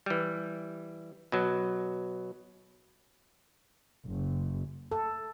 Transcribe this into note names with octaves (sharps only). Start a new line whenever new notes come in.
E3 G3
B2 F#3
F#1
A4